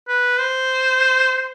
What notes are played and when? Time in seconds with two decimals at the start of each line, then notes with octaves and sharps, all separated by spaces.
0.08 B4
0.39 C5